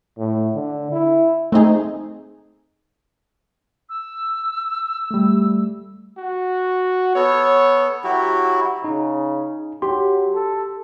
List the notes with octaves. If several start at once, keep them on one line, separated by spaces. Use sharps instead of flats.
A2
D3
E4
A3 C4 D#4 G#4
E6
G3 A3
F#4
B3 A4 C#5
F#3 E4 F#4 G4
C#3 D#4
F#3 G4 C6
A4